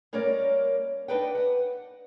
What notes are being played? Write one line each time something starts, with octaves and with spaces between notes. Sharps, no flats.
G3 A#3 C#4 A#4 C#5 D5
D4 D#4 B4 D5 F#5 G5
F#5